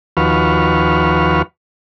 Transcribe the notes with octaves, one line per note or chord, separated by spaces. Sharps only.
D#2 F3 F#4 B4 C#6 F6